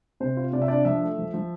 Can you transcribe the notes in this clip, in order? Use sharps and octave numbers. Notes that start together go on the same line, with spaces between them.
C3 C5
F4
C3 D5
E5
D4 D5
F3 E5
A3
F3
F3